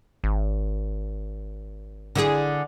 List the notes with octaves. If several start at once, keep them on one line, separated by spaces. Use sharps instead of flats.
G#1
D3 E4 G#4